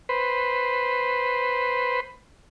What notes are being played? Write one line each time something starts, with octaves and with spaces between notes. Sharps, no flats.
B4 C5